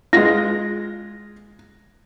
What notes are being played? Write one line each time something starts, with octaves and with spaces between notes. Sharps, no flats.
G#3 F4 A#6